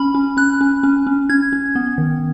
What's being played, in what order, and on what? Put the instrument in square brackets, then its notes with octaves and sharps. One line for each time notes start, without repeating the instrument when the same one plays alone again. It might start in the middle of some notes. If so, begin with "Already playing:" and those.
Already playing: [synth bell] C#4 B5
C#4
C#4 F#6
C#4
C#4
C#4
C#4 G#6
C#4
B3
D#3